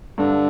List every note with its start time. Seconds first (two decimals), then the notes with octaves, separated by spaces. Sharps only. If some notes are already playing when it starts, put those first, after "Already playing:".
0.18 G2 D3